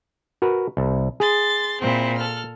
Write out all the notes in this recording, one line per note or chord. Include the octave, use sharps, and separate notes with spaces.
F#4 A#4 B4
C2
G#4 C6 A6
A#2 C4 E4
A4 F6